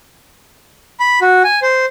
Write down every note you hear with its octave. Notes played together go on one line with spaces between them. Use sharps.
B5
F#4
G#5
C5